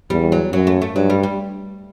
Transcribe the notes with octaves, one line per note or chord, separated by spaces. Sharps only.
E2 G3
F#3
F#2 F#3
A3
A3
G2 F#3
G3
G3